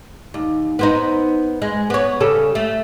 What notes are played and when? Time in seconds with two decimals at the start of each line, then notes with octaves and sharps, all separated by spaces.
0.34 D#2
0.79 B3 C4 D#4
1.62 G#3
1.90 B3 C#5
2.20 C#3 G3 A4
2.55 A3